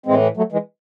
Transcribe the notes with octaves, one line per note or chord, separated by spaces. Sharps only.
A2 E3 G#3 C4
F#3 A3
E3 G#3